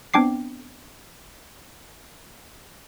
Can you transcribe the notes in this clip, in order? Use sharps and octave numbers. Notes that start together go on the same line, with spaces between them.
B3 C4 D4 G5 D6 C7